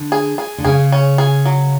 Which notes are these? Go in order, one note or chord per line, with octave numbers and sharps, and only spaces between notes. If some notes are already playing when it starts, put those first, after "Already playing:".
Already playing: D3
G#4
G#4
D3
C#3 G#4
C#4
G#4
F#3